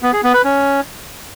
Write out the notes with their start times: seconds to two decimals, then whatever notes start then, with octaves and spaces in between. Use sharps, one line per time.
0.02 B3
0.13 G#4
0.23 B3
0.34 B4
0.44 C#4